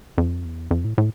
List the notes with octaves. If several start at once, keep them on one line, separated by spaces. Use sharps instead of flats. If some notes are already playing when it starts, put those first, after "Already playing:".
F2
E2
F2
A2
A2